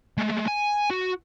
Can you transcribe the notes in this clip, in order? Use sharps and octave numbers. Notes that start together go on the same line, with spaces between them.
G#3 A3
G#5
F#4